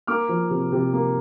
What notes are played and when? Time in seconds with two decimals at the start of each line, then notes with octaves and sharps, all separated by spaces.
0.07 A#3 D6 F6
0.29 F3
0.51 C3
0.72 C3
0.93 A#3